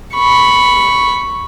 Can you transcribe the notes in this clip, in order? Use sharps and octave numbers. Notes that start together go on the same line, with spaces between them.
B5 C#6